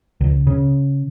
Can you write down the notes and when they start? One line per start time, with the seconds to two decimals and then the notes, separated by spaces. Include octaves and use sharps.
0.21 C#2
0.47 C#3